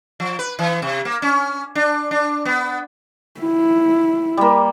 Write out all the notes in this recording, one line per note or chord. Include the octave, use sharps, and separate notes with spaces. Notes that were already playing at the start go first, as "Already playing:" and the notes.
F3
B4
E3
C3
A#3
C#4
D4
D4
B3
E4
G3 A#3